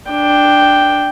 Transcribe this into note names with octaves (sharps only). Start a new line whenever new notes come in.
D4 G5